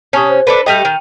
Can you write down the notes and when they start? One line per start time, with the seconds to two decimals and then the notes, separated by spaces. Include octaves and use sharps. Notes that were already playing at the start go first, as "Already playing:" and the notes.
0.13 C3 C#4 A5 C#6 D#6
0.29 C5
0.47 D4 A4 B4
0.66 G3 A3 D#5 G5 D#7 F7
0.85 D#3